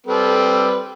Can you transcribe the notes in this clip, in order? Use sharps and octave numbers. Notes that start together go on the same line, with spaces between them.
G3 C4 A4 B4